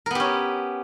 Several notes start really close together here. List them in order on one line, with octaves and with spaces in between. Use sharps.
A#4 B3 G4 C#4